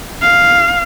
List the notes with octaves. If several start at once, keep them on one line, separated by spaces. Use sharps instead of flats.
F5